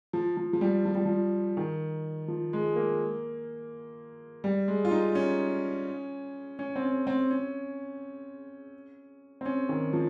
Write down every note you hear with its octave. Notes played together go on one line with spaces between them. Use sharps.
F3
F3
F3
G3
F3
G3
F3
D#3
F3
G#3
A#3
G3
G#3
F4
D#4
C#4
C#4
C4
C#4
C4
C#4
C4
C#4
D#3
F3